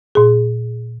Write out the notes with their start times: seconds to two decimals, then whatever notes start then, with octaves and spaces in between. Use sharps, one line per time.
0.15 A#2 G#4